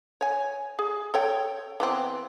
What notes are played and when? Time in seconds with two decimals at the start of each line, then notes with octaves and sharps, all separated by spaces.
0.21 C#5 G#5
0.79 G#4
1.14 A4 C#5 G5
1.80 E3 B3 C4